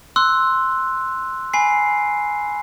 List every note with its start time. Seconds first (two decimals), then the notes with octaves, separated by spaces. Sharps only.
0.16 C6 E6 F#6
1.54 G#5 B5 C7